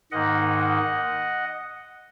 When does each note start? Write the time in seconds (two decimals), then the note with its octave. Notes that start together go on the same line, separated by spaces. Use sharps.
0.11 G#2 D#3 A#3 D#4 D#5 F#5
0.59 D#5 F#5